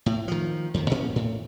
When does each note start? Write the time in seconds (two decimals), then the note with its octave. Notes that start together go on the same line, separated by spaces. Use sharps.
0.06 A2
0.28 D#3 F3
0.74 F2 D#3
0.90 A1 A#2 C4 C#4
1.16 A2